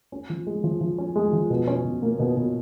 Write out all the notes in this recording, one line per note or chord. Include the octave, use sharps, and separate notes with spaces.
C#4
F3
G#3
F3
F3
C#4
G#3
F3
B2
C#4
B2
A#3
B2
B2